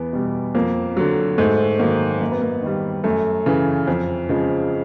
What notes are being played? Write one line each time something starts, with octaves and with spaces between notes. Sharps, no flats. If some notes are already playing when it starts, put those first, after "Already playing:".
Already playing: E2 B3
B2 G3
F2 A#3
D3 F#3
G#2 A3
D#3 F#3 A#3
F#2 A#3
B3
A#3
D#3 G3
F#2 A3
C#3 E3
F2
C#3 F3 G#3